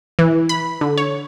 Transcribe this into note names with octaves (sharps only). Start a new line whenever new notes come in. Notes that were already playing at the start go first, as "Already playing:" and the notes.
E3
B5
D3
C#5